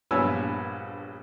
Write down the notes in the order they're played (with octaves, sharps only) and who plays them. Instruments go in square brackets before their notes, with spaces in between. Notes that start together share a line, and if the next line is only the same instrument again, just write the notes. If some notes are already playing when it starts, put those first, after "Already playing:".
[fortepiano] A#1 G2 B3 C#5 G#5 E6